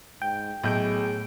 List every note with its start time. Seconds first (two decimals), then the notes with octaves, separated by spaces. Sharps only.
0.22 G#2 G5
0.64 B1 A2 G#4 G6 D7